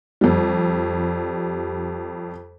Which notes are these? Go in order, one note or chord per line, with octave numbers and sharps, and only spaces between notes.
F2 G3